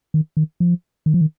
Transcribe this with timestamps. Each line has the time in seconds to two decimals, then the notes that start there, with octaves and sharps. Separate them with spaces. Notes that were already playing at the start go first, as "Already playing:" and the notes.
0.14 D#3
0.37 D#3
0.60 F3
1.06 D#3
1.14 F3
1.21 D#3